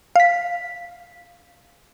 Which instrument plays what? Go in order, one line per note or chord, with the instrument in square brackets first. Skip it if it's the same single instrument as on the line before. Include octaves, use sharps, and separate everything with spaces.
[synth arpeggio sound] F5 B6